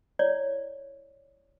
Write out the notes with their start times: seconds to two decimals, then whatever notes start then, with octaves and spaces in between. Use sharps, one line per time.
0.19 E4 C#5 D5